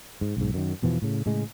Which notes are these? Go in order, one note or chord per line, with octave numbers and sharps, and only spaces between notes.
G#2
B1 G#2
F#2 D#3
E2 B2 E3 F3
A2 C#3
A2 C#3 G#3